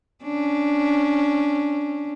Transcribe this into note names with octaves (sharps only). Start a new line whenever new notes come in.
C#4 D4